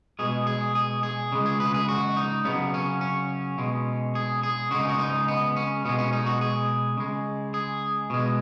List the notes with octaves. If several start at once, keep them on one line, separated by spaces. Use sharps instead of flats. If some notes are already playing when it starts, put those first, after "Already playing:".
B2 G#3 G#4
G#4
G#4
G#4
C#3 G#3
G#4
B4
G#4
F#4
D#4
C#3 F#3 B3
C#4
C#4
B2 G#3
G#4
G#4
C#3 G#3 F#4
D#4
F#4
D#4
B3
C#4
B2 G#3 B3
C#4
D#4
F#4
G#4
C#3 G#3
G#4
B2 G#3